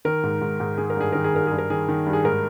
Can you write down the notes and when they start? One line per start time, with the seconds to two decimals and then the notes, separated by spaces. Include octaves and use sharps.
0.05 D#3 A#4
0.23 G#2
0.41 G#2
0.60 G#2
0.77 D#3 G#4
0.90 A#4
0.97 G2 G#4
1.13 D#3 A#4
1.24 G#4
1.33 G2 A#4
1.47 G2 G#4
1.58 A#4
1.70 D#3 G#4
1.89 D#3
2.06 G2
2.13 G#4
2.24 G#2 A#4